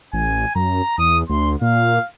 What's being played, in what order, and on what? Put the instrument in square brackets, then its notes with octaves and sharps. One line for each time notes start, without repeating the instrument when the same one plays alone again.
[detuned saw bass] A1 [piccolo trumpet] G#5
[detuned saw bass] F#2 [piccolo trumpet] A#5
[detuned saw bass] E2 [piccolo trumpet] D#6
[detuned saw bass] D2 [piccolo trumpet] C6
[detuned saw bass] A#2 [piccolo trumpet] F5